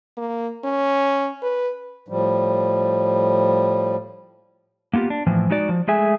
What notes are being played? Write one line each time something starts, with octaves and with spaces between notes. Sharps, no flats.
A#3
C#4
B4
A2 F3 G3
A#3 B3 E4 F4 G4
D4
A2 E3 F3
G#3 D#4 F#4 D5
F3
G#3 A3 G#4 E5 G#5